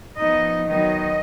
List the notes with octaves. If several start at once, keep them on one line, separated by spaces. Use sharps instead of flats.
F3 B3 D#4 D#5
D#3 F#3 B3 D#4 D#5